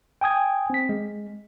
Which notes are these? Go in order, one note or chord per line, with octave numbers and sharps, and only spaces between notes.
G5 G#5 D#6 G#6
C4 B6
G#3